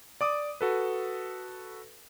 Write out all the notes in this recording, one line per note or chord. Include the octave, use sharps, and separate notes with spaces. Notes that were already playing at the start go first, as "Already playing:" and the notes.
D5 D6 D#6
F#4 A4 B4